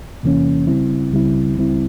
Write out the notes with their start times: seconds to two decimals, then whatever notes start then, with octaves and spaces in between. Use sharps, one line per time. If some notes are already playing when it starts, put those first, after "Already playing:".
0.23 E2 C3 E3 A#3 C#4
0.67 C#2 C#3 G3 C4 E4
1.12 C#2 C#3 G3 C4 E4
1.57 C#2 C#3 G3 C4 E4